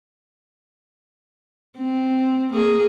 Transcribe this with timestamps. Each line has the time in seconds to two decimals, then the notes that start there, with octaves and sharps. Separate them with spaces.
1.78 C4
2.54 A#3 G#4